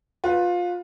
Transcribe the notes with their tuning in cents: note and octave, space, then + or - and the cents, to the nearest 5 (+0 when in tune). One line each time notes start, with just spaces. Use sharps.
F4 +20 B4 +0